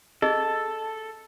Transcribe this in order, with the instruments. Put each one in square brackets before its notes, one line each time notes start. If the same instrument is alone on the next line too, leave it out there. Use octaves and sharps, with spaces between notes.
[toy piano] G#4 D#5 [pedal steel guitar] A4